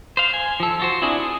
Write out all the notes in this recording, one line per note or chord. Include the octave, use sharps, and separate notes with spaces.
C5 F5
G#5
F3 A4
F4 F#4 C5
C4 D4 E4 F#4 G#4
G#4